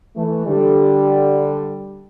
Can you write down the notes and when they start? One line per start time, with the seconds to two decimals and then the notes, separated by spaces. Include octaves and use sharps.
0.16 E3 A3
0.46 D3 G3